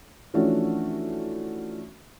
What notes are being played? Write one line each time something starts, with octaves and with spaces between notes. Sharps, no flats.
E3 F3 A3 C#4 D4 F#4